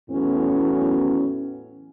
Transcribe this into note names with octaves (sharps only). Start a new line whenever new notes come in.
E2 A2 F#3 B3 C#4